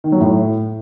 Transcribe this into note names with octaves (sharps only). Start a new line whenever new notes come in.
D#3
F#3
A2